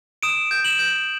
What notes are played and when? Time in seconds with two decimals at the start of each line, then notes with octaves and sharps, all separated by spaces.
0.23 D#6 D7 E7
0.51 G6
0.64 E7 F#7
0.79 G6